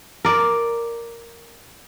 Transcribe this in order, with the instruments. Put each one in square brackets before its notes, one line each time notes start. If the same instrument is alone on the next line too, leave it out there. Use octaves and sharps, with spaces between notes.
[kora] A#4 D5